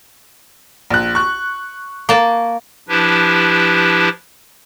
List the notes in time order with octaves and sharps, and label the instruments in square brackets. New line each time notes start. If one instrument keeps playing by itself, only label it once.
[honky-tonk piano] A#1 F#6
C#6 F#6
[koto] A#3 A5
[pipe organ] F3 D4 E4 G4 B4